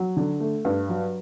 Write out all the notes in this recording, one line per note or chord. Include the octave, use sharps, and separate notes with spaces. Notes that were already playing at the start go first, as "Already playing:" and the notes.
Already playing: F#3
D3
A3
G2
F#3